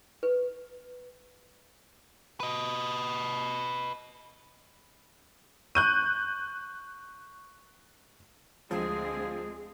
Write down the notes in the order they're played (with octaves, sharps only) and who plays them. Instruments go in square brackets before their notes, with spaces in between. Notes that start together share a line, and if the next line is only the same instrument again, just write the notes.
[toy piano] B4
[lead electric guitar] B4 D#5
[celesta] C#6 [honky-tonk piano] F#6 G6 D#7
[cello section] D2 G#3 C4 [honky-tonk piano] F3 [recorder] G#4